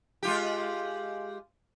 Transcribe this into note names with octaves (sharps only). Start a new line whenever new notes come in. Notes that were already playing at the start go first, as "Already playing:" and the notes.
G#3 F4 G4